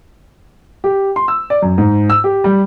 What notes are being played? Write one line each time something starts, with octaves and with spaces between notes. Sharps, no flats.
G4
C6
E6
D5
F#2
G#2
E6
G4
G3